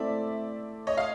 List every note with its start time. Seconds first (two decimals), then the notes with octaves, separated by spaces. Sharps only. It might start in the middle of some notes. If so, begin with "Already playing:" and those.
Already playing: A3 C4 E4 D5 E5
0.87 C#5 D#5
0.98 F5